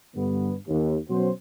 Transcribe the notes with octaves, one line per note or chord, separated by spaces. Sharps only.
G2 D3 B3
D#2
B2 F#3 C#4 F#4 C5